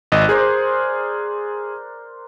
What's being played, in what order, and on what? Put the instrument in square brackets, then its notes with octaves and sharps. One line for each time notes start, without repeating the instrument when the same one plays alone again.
[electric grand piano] G#1 D#5 [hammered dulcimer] F#5
[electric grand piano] G#4 [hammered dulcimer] A#4 C5 D5